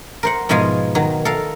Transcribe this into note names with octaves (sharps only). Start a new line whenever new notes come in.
A#4 C5 F#5
G#2 B2 F3 G#3 F4 G#5
D#3 F#3
A4 A#4 F5